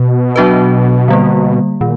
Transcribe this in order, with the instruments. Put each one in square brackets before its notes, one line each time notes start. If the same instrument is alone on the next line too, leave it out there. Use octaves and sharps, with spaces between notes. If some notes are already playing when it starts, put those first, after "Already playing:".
Already playing: [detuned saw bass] B2
[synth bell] F#3 B3 D4 F#4 B4
D3 G3 A#3
[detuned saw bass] A#2 [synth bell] D#3